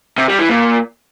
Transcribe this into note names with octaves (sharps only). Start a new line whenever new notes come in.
C3
G3
E3
A#2